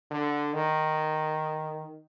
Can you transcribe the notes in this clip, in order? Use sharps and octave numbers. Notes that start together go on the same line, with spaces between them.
D3
D#3